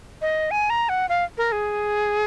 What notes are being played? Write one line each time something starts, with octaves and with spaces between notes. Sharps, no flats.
D#5
G#5
A#5
F#5
F5
A#4
G#4